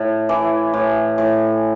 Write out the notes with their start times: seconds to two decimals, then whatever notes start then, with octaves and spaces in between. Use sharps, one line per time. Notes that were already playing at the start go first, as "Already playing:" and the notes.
Already playing: A2
0.29 E3
0.74 A2
1.18 A2